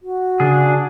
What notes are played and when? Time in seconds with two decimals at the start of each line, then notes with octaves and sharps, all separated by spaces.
0.01 F#4
0.40 C#3 D4 G#4